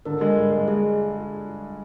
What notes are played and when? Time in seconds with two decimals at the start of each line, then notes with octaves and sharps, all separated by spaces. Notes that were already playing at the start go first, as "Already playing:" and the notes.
0.05 D3 A#4
0.21 G#3
0.37 G2
0.52 G#3
0.68 G#3 G#4